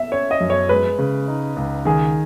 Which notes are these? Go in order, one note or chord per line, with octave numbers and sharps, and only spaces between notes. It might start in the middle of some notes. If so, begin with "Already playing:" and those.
Already playing: E5
C#4 C#5
D#5
F#2
C#5
G#3 B4
C#3
D#4
C#2
D#3 G#4